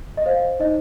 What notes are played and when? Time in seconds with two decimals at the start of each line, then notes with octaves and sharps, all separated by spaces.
0.17 D#5
0.26 C5 F5
0.60 D#4 D#5